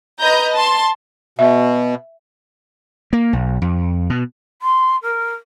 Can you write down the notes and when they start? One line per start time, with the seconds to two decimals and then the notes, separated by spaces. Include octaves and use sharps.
0.20 B4 D#5 A#5 G6
0.55 A5 C6
1.39 B2 E5
3.13 A#3
3.33 B1
3.62 F2
4.10 B2
4.61 C6
5.02 A#4